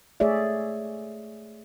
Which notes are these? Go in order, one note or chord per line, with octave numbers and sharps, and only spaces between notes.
A3 G#4 C#5 D5 E5